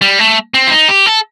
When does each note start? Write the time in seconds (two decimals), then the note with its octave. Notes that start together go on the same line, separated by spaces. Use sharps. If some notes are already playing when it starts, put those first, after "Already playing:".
0.02 G3
0.19 A3
0.54 C4
0.67 F4
0.71 D#4
0.88 G4
1.06 A4